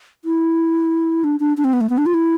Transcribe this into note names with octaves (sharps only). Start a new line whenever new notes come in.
E4
D4
D4
D4
C4
B3
A3
B3
D4
F4
E4